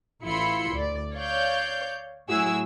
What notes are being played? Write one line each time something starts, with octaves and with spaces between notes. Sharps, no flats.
A1 E4 F4 B5 C6 C#7
D2 D5
C#5 D5 F5 G6
A2 F#3 E4 F#4 G#4 E6